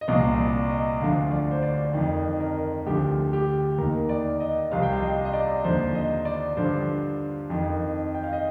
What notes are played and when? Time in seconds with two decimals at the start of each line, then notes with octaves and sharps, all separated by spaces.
0.01 D#5
0.08 C2 A#2 F3 F5
0.39 D5
0.70 D#5
1.01 D2 D3 F3 F5
1.32 D5
1.51 C5
1.63 D5
1.93 F2 D#3
2.40 A#4
2.86 D2 D3 F3 G4
3.33 G4
3.78 D#2 D#3 A#4
4.09 D5
4.40 D#5
4.72 C2 C3 F3 F5
4.83 G5
4.93 F5
5.03 D#5
5.25 D#5
5.33 D5
5.64 D#2 D3 F3 C5
5.95 D#5
6.25 D5
6.57 G2 D3 F3 C5
7.50 F2 D#3
8.15 G5
8.24 F5
8.33 D#5